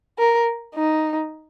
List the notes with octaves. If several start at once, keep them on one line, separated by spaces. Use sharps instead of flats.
A#4
D#4